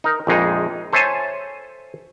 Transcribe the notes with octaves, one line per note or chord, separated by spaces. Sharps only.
D#4 A#4
A#1 F2 G#3 D#4
A4 C5 C#5 E5 G#5 A5